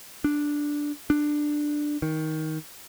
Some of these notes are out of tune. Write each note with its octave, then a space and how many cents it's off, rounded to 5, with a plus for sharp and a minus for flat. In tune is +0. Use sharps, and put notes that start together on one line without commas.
D4 +0
D4 +10
D#3 +15